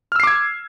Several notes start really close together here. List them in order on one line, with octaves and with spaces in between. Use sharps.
F6 E6 C7 D6 G#6